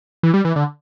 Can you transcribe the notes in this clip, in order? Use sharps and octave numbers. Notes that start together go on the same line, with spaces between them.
E3
G3
E3
D3